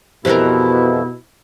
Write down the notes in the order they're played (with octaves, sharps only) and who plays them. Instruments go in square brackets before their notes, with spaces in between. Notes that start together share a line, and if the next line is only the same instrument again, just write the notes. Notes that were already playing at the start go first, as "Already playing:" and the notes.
[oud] F2 E3 A#4 [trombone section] B2 [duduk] E4 [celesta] G4 C5